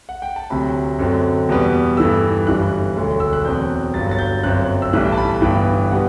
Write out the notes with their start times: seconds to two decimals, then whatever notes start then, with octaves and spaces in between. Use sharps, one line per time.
0.09 F#5
0.22 G5
0.36 A5
0.50 D2 C3 F#3 B5
0.99 F#2 D3 F#3 C4
1.49 E2 B2 G3 B3
1.97 G2 E3 A3 E6
2.47 G1 F#2 E3 G3 F#6
2.96 E1 D2 D3 F#3
3.20 E6
3.33 F#6
3.45 E2 B2 F#3 C4 G6
3.94 G1 G2 F#3 A6
4.11 A6
4.19 G6
4.43 G1 F#2 F#3 C4 F#6
4.82 E6
4.93 B1 A2 E3 G3 F#6
5.05 G5
5.12 A5
5.18 B5
5.30 A5
5.42 G1 G2 E3 B3 G5
5.92 B2 G3 B3 F#5